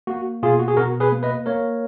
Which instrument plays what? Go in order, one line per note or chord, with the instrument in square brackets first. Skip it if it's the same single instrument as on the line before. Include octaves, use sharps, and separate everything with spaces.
[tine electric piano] A#3 F#4
B2 F4 G#4
F#4
G#4
B2 F#4 A#4
G#4 B4
A#3
B4 D#5
A#3 A#4 C#5